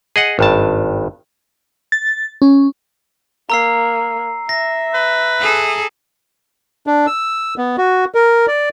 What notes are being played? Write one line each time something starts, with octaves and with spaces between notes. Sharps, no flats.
G#4 D#5 F#5
G#1 G2 A5
A6
C#4
A#3 A#5 E6 C7
E5 A#6
B4
G#4 A4
D4
E6
B3
F#4
A#4
D5